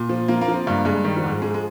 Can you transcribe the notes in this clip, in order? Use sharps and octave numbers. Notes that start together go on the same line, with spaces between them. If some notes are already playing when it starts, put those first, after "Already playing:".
Already playing: A#2
F3
F3 A#3
A#3
F3
C4
G2 A#3
G2 G#3
D#3 G3
F3
G#2
G#3
F3 G#3
G#3